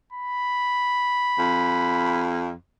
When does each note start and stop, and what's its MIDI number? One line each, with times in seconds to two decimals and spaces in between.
0.13 2.28 83
1.39 2.54 41